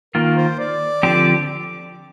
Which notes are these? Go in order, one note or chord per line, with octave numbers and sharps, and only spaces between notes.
D#3 A#3 F4 A#4
C5
D5
D3 F3 C4 G4